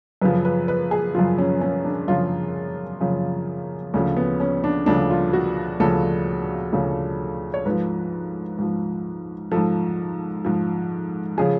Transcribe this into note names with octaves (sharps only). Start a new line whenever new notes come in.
F#2 C#3 F3 B4
B4
B4
G#4
F#2 C#3 F3 F4
C#4
C#4
D4
F#2 C#3 F3 F4
F#2 C#3 F3
D2 C#3 F3 C#4
B3
C#4
D4
D2 C#3 F3 D4
F4
F#4
D2 C#3 F3 A4
D2 C#3 F3
C#5
G#2 F3 B4
G#2 F3
G#2 F3 A4
G#2 F3
C#3 F3 G#4